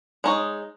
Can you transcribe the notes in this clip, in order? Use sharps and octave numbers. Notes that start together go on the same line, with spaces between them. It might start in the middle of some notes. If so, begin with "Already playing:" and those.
G#3 D#4 C#5